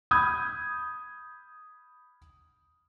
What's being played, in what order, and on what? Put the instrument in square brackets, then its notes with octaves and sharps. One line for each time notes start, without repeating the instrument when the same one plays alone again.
[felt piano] B5 D#6 G6 G#6